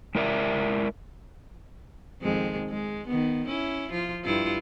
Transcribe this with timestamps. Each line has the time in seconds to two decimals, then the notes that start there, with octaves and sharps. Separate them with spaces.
0.15 G#3 E4 A#4 D5 E5
2.22 F2 D#3 G#3
2.69 G#3
3.08 D#3 B3
3.48 C#4 E4
3.91 F3 F4
4.24 G2 E4 F4